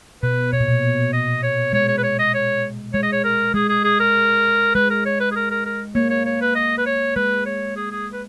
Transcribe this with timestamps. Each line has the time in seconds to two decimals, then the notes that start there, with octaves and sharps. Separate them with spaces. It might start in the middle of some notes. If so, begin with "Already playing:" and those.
0.23 B2 B4
0.52 B2 C#5
0.60 A#2
0.68 B2
1.13 D#5
1.43 C#5
1.73 G#3 C#5
1.88 C#5
1.98 B4
2.03 C#5
2.19 D#5
2.34 C#5
2.93 G#3 C#5
3.03 D#5
3.12 C#5
3.24 A#4
3.54 G#3 G#4
3.69 G#4
3.84 G#4
4.00 A#4
4.75 G#3 B4
4.90 A#4
5.06 C#5
5.20 B4
5.31 G#4
5.36 A#4
5.51 A#4
5.65 A#4
5.95 A#3 C#5
6.10 C#5
6.25 C#5
6.41 B4
6.55 D#5
6.78 B4
6.86 C#5
7.16 G#3 B4
7.46 C#5
7.76 G#4
7.91 G#4
8.13 B4